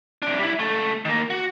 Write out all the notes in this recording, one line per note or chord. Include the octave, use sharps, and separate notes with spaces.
C3 D4
G3 E4
C#2 A3
D#3 A#3
F#4